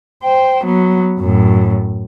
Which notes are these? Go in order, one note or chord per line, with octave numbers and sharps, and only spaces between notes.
C5 G5
F#3 B3
F#2 A2